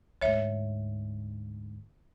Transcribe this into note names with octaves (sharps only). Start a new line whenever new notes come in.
D2 G#2 C#5 E5